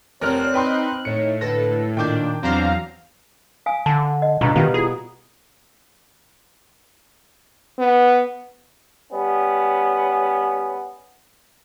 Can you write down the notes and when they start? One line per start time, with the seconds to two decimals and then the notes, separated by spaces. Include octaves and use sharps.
0.21 F1 C4 A#4 C#5 D5 F6 F#6
0.54 D#4 B4 G5 C6
1.05 A2 D#3 D#4 C#5 C#7
1.41 D3 A4 B4 A#6
1.97 A#2 D#3 D4 G5 D6 G6
2.43 E2 F#3 C4 D4 C5 F5 A#5
3.66 F5 G#5 D#6
3.86 D3 A5
4.22 D#5
4.41 G1 C#2 B2 A#5 C#6 D#6
4.56 B2 D#3 G3 B4 F5
4.74 E4 F4 G#4
7.79 B3
9.13 G3 B3 C#4